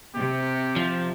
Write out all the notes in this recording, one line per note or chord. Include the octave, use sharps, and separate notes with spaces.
C3 G4
F3